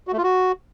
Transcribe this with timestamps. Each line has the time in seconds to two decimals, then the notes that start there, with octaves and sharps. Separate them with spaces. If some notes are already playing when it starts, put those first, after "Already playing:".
0.07 F#4
0.13 A3
0.18 F4
0.23 F#4